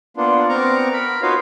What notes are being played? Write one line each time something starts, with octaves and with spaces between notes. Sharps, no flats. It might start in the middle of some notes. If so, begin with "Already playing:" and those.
A#3 B3 D4 F4
B3 C4 A#4 A#5 C#6 D6
A#4 B5
D#4 F4 F#4 B4 C#5 F5